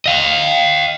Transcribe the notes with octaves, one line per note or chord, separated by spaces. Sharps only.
D#5 F5